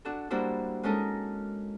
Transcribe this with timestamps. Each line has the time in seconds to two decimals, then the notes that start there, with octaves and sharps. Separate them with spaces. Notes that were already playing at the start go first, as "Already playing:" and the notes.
0.05 D4 F#4 A4
0.30 G3 A#3 D4 E4 F#4 C5
0.83 G#3 C#4 D#4 A4 A#4